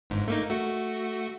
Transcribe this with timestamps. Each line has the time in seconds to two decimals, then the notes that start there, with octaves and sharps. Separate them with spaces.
0.10 G1 G#2
0.28 A3 A#3 D#4
0.49 A3 F#4